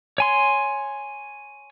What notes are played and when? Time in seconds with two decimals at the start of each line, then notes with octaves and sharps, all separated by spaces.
0.18 C#5 G#5 C6